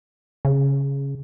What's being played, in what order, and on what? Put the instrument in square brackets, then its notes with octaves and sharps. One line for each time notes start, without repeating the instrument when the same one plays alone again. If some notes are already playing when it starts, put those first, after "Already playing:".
[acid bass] C#3